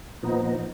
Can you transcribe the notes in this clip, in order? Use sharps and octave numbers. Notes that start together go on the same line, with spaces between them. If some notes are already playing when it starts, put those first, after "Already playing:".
A#2 F3 B3 D#4